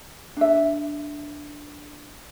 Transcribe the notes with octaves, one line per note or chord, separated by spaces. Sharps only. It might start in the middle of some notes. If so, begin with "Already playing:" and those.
D4 E5